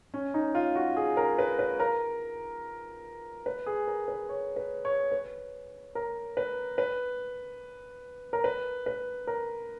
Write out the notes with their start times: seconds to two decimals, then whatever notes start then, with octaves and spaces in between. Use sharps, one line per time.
0.14 C#4
0.34 D#4
0.55 F4
0.76 F#4
0.97 G#4
1.17 A#4
1.38 B4
1.59 B4
1.80 A#4
3.46 B4
3.66 G#4
3.88 A#4
4.08 B4
4.29 C#5
4.56 B4
4.85 C#5
5.12 B4
5.95 A#4
6.37 B4
6.78 B4
8.33 A#4
8.44 B4
8.86 B4
9.27 A#4